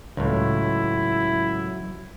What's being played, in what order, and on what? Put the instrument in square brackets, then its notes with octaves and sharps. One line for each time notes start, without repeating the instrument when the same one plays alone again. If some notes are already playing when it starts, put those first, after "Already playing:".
[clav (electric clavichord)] C#2 A2 [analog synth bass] F#3 [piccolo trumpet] E4